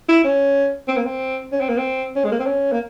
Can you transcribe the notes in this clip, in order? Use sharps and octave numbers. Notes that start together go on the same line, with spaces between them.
E4
C#4
C4
A#3
C4
C#4
C4
A#3
C4
C#4
G#3
A#3
C4
C#4
A#3